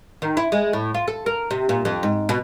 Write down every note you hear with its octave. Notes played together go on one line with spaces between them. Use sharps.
D#3
E4
G#3
A2
F4
A4
A#4
C3
A#2
F2
G#2
B2